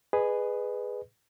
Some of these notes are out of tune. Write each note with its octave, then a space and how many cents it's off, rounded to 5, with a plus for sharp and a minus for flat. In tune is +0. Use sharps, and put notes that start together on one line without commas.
G#4 +0 B4 +5 D#5 -35